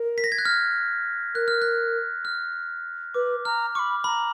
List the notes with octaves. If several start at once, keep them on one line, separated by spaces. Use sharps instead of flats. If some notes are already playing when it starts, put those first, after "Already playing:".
Already playing: A#4
B6
A#6
G#6
F#6
F6
A#4 F#6
F6
F#6
F6
B4 D6
A#5 F6
B5 C#6 D6
A#5 B5